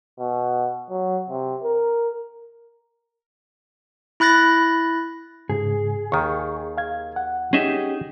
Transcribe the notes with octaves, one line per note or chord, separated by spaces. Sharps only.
B2
F#3
C3
A#4
E4 B5 F#6 A6 A#6
G#2 C#3 G#4
D#2 D#3 C#6
F5 G#6
F#5
C#4 D#4 G4 G#4 D#5 E5